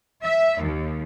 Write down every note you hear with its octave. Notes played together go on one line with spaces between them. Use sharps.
E5
D#2